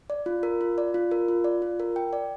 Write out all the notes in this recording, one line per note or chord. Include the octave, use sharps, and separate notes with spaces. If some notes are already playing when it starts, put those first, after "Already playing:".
D5
F4
A#4
F4
D5
F4
A#4
F4
D5
F4
A#4
G5
D5